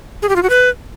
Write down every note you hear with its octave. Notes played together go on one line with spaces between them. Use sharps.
G#4
G4
F4
F#4
B4